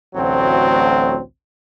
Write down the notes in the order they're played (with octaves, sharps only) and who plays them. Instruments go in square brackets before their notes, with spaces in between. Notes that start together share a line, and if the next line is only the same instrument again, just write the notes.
[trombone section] A1 D2 F#3 C4